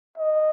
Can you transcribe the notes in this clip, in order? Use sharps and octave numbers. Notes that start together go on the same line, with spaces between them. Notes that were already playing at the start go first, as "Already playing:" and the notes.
D#5